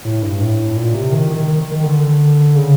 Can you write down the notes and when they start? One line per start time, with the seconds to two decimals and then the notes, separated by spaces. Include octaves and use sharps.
0.05 A2
0.22 G2
0.40 A2
0.76 A#2
0.94 C3
1.12 D#3
1.30 D#3
1.48 D#3
1.71 D#3
1.83 D3
2.55 C#3